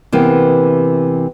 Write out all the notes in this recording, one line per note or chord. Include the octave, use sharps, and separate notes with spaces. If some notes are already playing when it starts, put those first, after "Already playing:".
C3 E3 A#3 B3